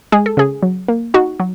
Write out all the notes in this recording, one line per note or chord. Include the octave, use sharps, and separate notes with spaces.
G#3 G#4
A4
C#3 G#4
F#3
A#3
D#4 F#4
F#3